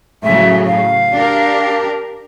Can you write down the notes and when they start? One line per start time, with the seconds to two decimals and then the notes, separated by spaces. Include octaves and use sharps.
0.23 A2 C#3 F#3 E5
0.65 F5
1.13 D4 G4 A#4